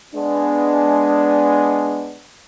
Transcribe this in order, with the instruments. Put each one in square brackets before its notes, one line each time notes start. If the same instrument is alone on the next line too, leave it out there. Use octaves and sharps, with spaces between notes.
[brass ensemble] G#3 B3 D4